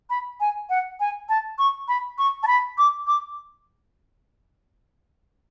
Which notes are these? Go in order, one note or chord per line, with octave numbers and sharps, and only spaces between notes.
B5
G#5
F#5
G#5
A5
C#6
B5
C#6
A5
B5
D6
D6